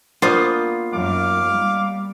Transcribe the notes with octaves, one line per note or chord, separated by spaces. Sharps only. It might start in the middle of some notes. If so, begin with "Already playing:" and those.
A#3 B3 D4 F4 C5 D#6
F#2 D#4 F5 D6
G3